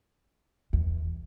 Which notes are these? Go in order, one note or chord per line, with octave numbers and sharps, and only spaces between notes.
E2